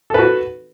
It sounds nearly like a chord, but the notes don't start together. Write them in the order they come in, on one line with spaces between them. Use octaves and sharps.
A4 B4 F#4